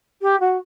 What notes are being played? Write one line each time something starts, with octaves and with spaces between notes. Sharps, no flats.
G4
F#4